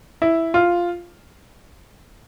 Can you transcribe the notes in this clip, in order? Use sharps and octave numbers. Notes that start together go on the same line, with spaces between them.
E4
F4